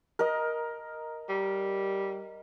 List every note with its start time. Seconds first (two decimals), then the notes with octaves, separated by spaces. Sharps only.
0.19 A#4 D#5
1.29 G3